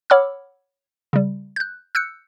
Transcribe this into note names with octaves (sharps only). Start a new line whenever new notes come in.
C#5 F#5 B5 D6 E6 F6
C#3 G3
F#6 G6
E6 F#6 G6 C#7